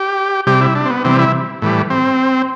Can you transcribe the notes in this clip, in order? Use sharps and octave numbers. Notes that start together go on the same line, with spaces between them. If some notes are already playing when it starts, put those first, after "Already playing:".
Already playing: G4
C3 G3 G4
E4
D4
C4
B3
C3 E3 G3 C4
E4
A2 E3 G3
C4